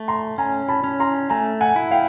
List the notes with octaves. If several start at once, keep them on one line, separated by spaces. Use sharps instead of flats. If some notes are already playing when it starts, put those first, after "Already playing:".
Already playing: A3
A#5 C6
C#4 G#5 A#5
A5 B5
C#4
A#5 C6
A3 G#5 A#5
F#5 G#5
E4
F5 G5